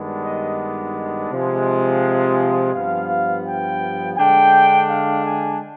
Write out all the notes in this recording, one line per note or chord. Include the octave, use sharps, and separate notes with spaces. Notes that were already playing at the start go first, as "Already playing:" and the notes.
Already playing: G2 D#3 G#3 B3 D4
D#5
C3 F3 G#3
G2 F3 B3 F5
G5
D3 G#3 D4 G5
F5
G#5